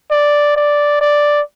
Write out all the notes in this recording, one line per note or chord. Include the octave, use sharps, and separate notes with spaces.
D5
D5
D5